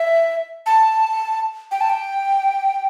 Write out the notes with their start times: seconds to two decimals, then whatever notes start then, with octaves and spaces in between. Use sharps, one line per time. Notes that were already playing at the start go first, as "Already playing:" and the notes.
Already playing: E5
0.66 A5
1.71 G5
1.81 A5
1.90 G5